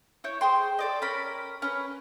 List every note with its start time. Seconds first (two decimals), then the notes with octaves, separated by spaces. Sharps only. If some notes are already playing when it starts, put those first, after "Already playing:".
0.24 E4 C#5 G6
0.41 G#4 C5 G5 C6
0.79 A4 D5 D#5
1.02 C#4 A#4 B5
1.62 C#4 B4